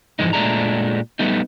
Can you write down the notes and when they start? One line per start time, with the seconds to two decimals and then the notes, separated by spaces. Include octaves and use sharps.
0.19 G#2 E3 F3 G#3 D#4
0.33 A#2 G#3 A3 D4 G#4 A#5
1.19 G3 A3 B3 D#4